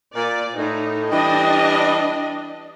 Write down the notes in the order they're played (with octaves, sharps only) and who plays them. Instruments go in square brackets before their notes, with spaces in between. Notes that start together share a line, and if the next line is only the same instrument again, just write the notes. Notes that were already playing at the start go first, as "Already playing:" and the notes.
[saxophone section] A#2 [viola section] D5
[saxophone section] A2 [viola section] D#4
[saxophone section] E3 G3 [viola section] D4 D#5